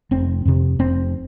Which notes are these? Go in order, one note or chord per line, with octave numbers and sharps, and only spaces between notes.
F1 C4
F2 C3
F1 C4